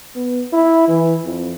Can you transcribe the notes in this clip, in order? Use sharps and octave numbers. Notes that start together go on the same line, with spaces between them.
B3
E4
E3
F2